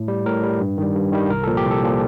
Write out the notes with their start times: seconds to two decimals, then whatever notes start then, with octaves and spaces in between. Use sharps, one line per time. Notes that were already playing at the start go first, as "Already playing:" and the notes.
Already playing: A2
0.08 G3
0.26 A2 A#4
0.43 G3
0.61 G2
0.78 D#3 G3
0.95 G2
1.12 D#3 G3
1.30 C2 A#4
1.43 A#2 F3 A4
1.57 G4
1.65 C2
1.71 A4
1.83 A#2 F3